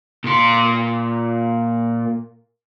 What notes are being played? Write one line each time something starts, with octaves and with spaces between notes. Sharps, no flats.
A#2 C6